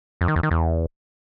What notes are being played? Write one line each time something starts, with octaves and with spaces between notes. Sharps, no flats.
F2
D#3
E2
D#3
E2